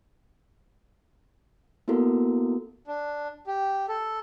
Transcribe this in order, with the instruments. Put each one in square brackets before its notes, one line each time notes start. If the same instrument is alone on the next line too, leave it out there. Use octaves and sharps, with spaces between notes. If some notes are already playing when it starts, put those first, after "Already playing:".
[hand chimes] A#3 B3 E4 F#4 A4 A#4
[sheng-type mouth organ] D4
G4
A4